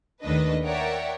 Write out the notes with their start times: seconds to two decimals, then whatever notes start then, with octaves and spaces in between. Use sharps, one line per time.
0.23 D#2 D#3 A3 D4 B4 D#5
0.64 A#4 C#5 D5 E5 F#5 G5